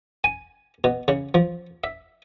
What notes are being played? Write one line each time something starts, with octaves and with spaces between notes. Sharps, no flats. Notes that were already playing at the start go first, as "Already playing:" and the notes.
G#5
B2
C#3
F3
E5